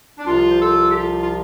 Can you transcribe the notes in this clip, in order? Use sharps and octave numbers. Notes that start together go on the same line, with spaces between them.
D4
C2 C3 F3 F4
C5
F4 A4
G4
F4
F4